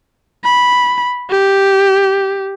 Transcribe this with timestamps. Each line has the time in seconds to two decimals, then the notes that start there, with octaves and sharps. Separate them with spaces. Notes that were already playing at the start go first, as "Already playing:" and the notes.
0.44 B5
1.30 G4